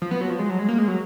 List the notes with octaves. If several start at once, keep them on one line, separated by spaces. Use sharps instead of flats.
F3
B3
F#3
F3
G#3
F#3
G#3
A#3
G#3
F#3